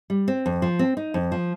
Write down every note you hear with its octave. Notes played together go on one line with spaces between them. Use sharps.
G3
C4
F2
F3
C4
D#4
F2
F3